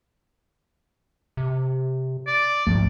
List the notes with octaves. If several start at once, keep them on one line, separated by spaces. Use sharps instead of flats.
C3
D5
G#1 D2 F3 A3